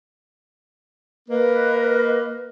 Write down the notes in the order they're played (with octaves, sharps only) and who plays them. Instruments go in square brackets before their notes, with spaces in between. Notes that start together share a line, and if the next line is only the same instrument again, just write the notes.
[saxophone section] A#3 [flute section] B4 D#5